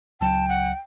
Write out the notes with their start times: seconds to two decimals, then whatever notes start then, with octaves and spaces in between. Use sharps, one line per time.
0.21 C#2 F#3 G5 A5
0.49 F#5